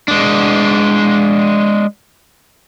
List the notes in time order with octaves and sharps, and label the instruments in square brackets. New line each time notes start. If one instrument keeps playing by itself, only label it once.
[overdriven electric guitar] G#3 D4